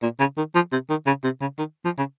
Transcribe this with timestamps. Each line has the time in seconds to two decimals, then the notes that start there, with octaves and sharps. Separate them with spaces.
0.02 A#2
0.19 C#3
0.37 D#3
0.55 F3
0.72 C3
0.90 D#3
1.06 C#3
1.24 C3
1.41 C#3
1.58 D#3
1.85 F3
1.98 C#3